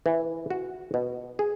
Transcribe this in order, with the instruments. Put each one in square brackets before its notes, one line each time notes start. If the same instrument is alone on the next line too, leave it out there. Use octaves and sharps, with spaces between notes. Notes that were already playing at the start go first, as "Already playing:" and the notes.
[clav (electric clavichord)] E3
F#4
B2
G#4